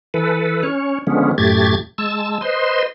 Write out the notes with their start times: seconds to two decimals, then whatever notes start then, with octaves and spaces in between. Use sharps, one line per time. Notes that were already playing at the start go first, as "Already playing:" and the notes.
0.14 E3 A4 B4
0.63 C#4 C#5
1.07 D3 F3 G#3 B3 C#4
1.38 F#2 A2 A3 G4 G#6 A6
1.98 G#3 A5 E6
2.41 B4 C5 D#5 C6